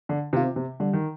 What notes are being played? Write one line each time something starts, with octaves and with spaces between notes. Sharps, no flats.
D3
C3 D#3 C4 F4
C3
D3 G3
D#3